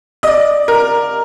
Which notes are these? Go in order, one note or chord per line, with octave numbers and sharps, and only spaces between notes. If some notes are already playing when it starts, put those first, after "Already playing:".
D#5
D5
A#4